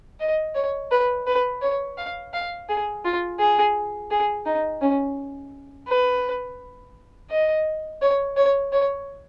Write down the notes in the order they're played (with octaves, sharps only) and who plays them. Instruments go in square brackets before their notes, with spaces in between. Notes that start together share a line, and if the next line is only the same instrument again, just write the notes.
[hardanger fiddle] D#5
C#5
B4
B4
C#5
F5
F5
G#4
F4
G#4
G#4
D#4
C#4
B4
D#5
C#5
C#5
C#5